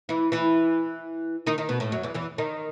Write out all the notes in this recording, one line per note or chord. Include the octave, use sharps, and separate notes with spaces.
E3 E4
E3 E4
D#3 D#4
D#3 D#4
B2 B3
A2 A3
F#2 F#3
E2 E3
E2 E3
D#3 D#4